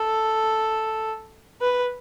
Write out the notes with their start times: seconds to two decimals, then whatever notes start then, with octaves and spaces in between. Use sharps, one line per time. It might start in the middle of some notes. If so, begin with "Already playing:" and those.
Already playing: A4
1.61 B4